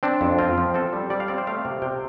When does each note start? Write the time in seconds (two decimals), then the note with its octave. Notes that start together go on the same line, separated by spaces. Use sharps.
0.03 C4 D4
0.21 F2
0.39 C4 F4
0.58 F3
0.74 C4 A4
0.93 G3
1.10 G3 D5
1.20 F5
1.28 C4 D5
1.38 C5
1.47 A3 F5
1.65 C3
1.82 C3 G5